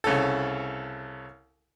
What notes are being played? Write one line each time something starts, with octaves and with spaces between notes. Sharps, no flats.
C2 C#3 C#4 A4